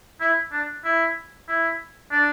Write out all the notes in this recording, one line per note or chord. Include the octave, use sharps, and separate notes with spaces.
E4
D4
E4
E4
D4